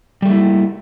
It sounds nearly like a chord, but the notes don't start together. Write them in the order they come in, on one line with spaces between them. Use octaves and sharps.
G3 A3 A#3 E4